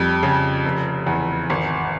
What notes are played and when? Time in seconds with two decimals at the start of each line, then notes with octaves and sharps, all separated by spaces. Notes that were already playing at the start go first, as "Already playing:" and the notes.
Already playing: F2 G3
0.23 C#3
0.65 F1
1.06 E2
1.50 G#1